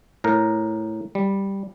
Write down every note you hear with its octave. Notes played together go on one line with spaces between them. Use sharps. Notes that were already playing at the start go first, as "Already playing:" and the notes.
A2 A#4
G3